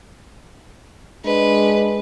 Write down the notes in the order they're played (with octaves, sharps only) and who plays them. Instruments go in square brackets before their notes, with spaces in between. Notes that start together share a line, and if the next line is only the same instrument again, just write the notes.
[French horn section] G#3 D4 [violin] B4